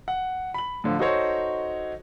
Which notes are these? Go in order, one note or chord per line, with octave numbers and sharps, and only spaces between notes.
F#5
B5 F#7
A2 D3 F3
D#4 F#4 A4 C5 C#5